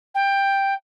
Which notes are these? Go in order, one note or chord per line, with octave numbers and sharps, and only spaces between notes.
G5